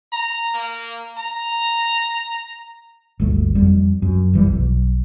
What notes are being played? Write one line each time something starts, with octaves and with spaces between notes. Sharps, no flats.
A#5
A#3
A#5
G1 D2 A3
F2 G3
F#2
F#1 E3 G3
B1